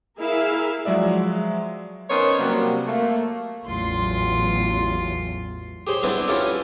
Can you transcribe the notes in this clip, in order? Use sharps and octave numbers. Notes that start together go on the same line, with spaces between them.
E4 G#4 A#4 E5 F5
F3 F#3 G#3 D5 E5
B3 C#4 D#4 A#4 C5 C#5
C3 F#3 G3 A#3
A3 A#3
A1 E2 F#3 F4 C6
G4 G#4 C5 C#5
G3 B3 C4 D4 E4 B4
C#4 E4 F4 G4 A4 C#5
G#5